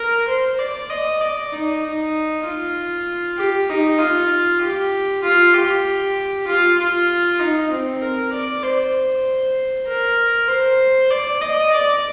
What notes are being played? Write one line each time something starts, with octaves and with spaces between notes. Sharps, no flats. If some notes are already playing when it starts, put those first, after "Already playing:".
Already playing: A#4
C5
D5
D#5
D5
D#4
D#4
F4
G4
D#4
F4
G4
F4
G4
F4
F4
D#4
C4
A#4
D5
C5
A#4
C5
D5
D#5
D5